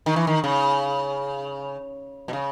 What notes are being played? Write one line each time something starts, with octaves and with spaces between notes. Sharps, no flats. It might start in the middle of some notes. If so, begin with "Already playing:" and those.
D#3
E3
D#3
C#3
B2
C#3